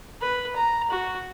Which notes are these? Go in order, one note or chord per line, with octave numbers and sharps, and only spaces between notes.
B4
A#5
F#4